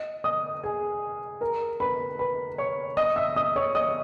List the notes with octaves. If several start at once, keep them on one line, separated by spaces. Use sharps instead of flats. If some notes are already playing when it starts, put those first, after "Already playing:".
Already playing: D#5
D#5 D#6
G#4 G#5
A#4 A#5
B4 B5
B4 B5
C#5 C#6
D#5 D#6
E5 E6
D#5 D#6
C#5 C#6
D#5 D#6